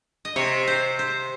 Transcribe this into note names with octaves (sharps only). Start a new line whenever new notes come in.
D#5
C3 C#5
C5
C5